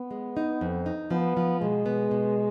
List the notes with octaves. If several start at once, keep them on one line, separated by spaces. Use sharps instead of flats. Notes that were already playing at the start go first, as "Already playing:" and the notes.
Already playing: B3
G#3
D#4
F2
D#4
F3 B3
F3
B2 G#3
B3
B2